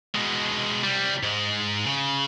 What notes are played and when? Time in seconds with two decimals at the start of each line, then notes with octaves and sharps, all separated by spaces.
0.15 B2 G#3
0.83 C2 G3
1.23 G#2 G#3
1.86 C#3